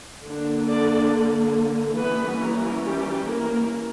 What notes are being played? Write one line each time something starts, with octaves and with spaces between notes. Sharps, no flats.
D3 A#3 D4
D4 D5
E3 G3 A#3 B3 C#4 B4
A#3 A#4
G3 G4
A#3 A#4